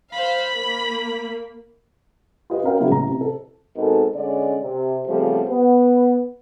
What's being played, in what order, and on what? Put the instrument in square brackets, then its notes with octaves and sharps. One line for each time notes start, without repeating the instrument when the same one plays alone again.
[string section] C5 F5 [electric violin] B5
[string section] A#3
[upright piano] F4 G4 B4 D#5
C#4 F#4 A#4 F5 G5
C#3 F#3 A#3 B3 E4 F#4
A1 A#5
C3
A4
[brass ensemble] B2 G#3 C4 D#4 A4 A#4
D3 G#3 C#4 D5
C3
C#3 F3 G3 A3 B3 C4
B3